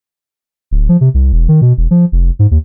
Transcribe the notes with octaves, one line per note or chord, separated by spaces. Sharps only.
D1
F3
C3
C2
E1
D#3
B2
E1
F3
F1
G#2
D#2